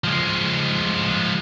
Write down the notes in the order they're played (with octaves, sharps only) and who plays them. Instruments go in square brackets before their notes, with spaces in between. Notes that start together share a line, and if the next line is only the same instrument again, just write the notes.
[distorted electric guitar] F3 G#3